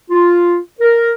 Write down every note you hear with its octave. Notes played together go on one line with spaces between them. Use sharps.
F4
A#4